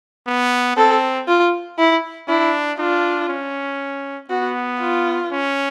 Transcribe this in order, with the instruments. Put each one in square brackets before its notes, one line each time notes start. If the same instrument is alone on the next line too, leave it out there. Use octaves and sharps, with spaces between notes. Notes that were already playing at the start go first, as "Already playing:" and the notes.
[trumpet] B3
[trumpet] C4 [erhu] A4
[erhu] F4
E4
[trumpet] D4 [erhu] E4
[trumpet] D4 [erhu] F4
[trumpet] C#4
[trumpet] B3 [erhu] F#4
[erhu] F4
[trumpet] C#4